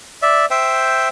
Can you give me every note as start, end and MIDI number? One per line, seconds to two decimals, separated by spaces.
0.22 0.46 74
0.22 0.46 76
0.51 1.09 72
0.51 1.09 76
0.51 1.09 79